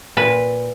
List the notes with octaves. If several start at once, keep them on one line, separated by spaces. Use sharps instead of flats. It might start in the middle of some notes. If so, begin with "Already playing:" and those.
A#2 B4